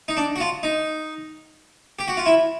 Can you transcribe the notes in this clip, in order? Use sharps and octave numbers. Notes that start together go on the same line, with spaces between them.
D#4
D4
F#4
F4
D#4
G4
F#4
F4
E4